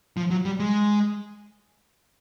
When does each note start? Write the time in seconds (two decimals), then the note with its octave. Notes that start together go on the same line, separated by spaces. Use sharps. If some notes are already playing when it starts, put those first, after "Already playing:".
0.17 F3
0.31 F#3
0.45 G3
0.60 G#3